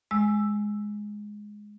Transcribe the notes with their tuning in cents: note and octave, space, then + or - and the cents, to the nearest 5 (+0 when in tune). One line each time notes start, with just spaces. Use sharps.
G#3 +0 E6 +0